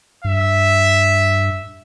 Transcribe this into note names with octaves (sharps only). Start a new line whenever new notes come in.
G2 E5